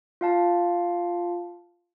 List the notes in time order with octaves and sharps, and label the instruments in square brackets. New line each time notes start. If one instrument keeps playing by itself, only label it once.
[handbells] F4 F5 A5